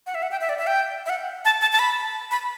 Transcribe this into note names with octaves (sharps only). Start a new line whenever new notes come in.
F#5
E5
F#5
G5
E5
D5
E5
G5
E5
F#5
A5
A5
A5
B5
B5